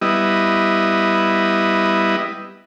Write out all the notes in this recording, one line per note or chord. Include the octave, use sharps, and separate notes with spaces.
G3 B3 E4 D#5